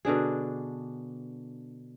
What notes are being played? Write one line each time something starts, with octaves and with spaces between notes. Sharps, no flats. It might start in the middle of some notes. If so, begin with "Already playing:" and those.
B2 D3 D4 G#4